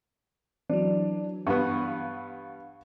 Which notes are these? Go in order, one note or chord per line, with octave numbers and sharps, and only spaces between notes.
E3 F#3 D4
G2 B3 F5 F#5 C#6